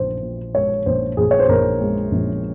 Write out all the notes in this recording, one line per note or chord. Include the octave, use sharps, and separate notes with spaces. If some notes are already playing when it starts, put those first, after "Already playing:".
Already playing: A#1 A#2 C5
A#2
G#3 C#5
A#1 C5
A#1 G#4
C#5
C5
A#1 A#4
G#3
A#1